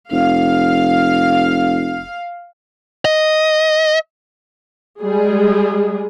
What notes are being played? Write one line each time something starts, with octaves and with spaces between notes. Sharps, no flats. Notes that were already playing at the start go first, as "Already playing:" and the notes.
F1 F5
D#5
G3 G#3 G#4